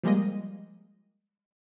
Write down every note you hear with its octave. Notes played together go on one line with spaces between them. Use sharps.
F3 G3 G#3 A#3 D#5